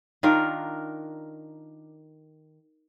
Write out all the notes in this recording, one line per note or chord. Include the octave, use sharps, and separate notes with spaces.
D#3 D4 F4 A#4